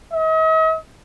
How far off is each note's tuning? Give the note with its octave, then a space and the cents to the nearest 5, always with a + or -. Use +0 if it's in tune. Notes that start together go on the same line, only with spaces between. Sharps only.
D#5 +45